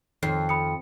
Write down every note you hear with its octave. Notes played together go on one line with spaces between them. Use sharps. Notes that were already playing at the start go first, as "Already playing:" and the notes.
F2 D#3 C7
B5 D#6 C#7